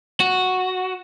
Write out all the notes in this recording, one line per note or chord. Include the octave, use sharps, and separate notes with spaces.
F#4